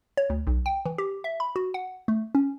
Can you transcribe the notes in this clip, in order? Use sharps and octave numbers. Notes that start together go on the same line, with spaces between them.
C#5
D2
B1
G5
E3
G4
E5
B5
F#4
F#5
A3
C#4